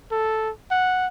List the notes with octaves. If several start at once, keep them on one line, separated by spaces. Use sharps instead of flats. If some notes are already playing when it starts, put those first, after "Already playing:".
A4
F#5